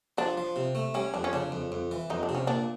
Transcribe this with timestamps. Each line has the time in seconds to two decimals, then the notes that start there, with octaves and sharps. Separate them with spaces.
0.18 F3 D4
0.38 F3
0.56 C3
0.75 A3
0.94 G3 C#4
1.14 F2 D4
1.24 C#4
1.33 C#3 D4
1.52 F2
1.72 F2
1.91 E3
2.10 F2 D#4
2.23 D4
2.29 C3
2.35 C#4
2.47 A#2 D4